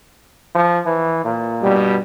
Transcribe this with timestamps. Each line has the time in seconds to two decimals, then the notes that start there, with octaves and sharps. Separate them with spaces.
0.55 F3
0.86 E3
1.25 A#2
1.61 G2 B2 G3